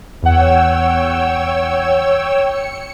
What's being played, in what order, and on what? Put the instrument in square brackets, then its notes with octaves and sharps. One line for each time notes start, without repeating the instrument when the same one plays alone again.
[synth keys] E2 F#5 [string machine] C#5 G5 E6
[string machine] C#7